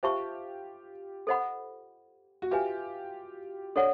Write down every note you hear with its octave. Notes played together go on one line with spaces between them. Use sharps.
F4 G4 C5 E5 A5 C#6
A4 C5 D#5 F#5 B5
F#4
F4 G4 B4 E5 G#5
D4 A4 C#5 F#5